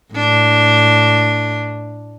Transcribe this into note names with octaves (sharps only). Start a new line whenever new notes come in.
A2 D4